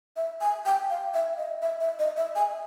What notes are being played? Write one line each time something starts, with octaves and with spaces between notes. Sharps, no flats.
E5
G#5
G5
F5
E5
D#5
E5
E5
D#5
E5
G#5